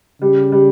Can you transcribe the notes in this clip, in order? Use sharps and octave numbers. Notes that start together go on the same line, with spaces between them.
C#3 G3
G3